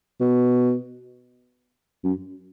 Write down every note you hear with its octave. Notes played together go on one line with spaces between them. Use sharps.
B2
F#2